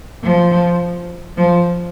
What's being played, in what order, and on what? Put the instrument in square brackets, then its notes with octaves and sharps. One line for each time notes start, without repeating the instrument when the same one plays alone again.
[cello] F3
F3